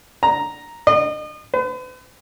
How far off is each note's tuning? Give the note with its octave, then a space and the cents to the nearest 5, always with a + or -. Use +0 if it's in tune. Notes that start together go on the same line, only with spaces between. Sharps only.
A#5 +0
D#5 -35
B4 +45